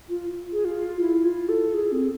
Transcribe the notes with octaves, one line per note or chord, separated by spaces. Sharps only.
F4
G#4
F4
E4
F4
A4
G#4
C4